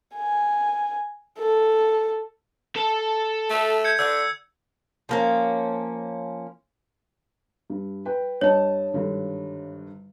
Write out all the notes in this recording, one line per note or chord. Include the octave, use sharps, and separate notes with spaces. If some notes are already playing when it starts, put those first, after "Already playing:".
G#5
A4
A4 A5
A3
G6 G#6 C#7
D3 E6
F3 A#3 C#4
G2
B4 G5
G2 C#5 D#5 A5
G#1 G2 D3